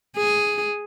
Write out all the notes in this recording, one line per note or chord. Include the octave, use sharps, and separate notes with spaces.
G#4